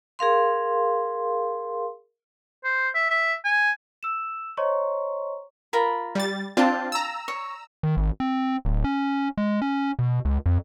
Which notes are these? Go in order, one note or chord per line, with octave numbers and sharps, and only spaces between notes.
G#4 A#4 F5 C6
C5
E5
E5
G#5
E6 E7
C5 C#5 D#5 A#5 C6 C#6
F4 A#4 B5
G3 A6
C4 D4 F4 F5 G5 A5
A#5 E6
C#5
D#3
G#1
C4
D1
C#4
G#3
C#4
B2
C#2
F2